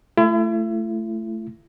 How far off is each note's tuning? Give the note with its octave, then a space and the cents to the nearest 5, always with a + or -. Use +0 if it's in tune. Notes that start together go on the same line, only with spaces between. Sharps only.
A3 +0 E4 +40